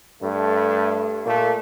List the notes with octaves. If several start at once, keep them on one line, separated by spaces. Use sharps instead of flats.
G2 A3
A#2 A3 A#3